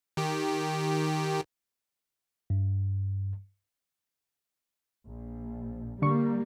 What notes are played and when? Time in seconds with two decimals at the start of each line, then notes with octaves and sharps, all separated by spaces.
0.17 D#3 G4
2.50 G2
5.07 A#1
6.02 D3 G3 A#3 C#6